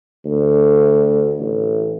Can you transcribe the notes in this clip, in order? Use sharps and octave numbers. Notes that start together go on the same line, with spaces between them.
D2
A1